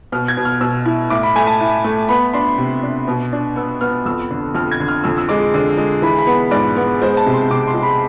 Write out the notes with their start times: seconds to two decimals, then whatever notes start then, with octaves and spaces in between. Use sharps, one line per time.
0.12 B2 F6
0.28 G#6
0.37 B2
0.45 F6
0.61 B2 E6
0.85 E4
1.10 A2 D6
1.23 B5
1.35 A3 G#5
1.47 A5
1.60 A2
1.84 A3
2.09 B3 B5
2.34 D4 C6
2.58 C3
2.83 D4
3.08 B2
3.32 D4
3.56 B3 E6
3.81 B3 F6
4.06 F2 E6
4.31 D3
4.55 F2 F6
4.72 G#6
4.80 D3
4.88 F6
5.04 F2 E6
5.18 E6
5.29 G#3 D6
5.54 D3
5.78 G#3
6.02 E3 B5
6.19 B5
6.27 B3
6.51 G#2 D5
6.76 B3
7.02 G#3 C5
7.17 A5
7.26 C3
7.34 C6
7.50 C3 D6
7.67 C6
7.74 G#3
7.83 B5